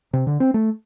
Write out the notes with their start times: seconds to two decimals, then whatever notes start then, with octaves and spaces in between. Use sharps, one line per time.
0.13 C3
0.27 D3
0.40 C4
0.54 A3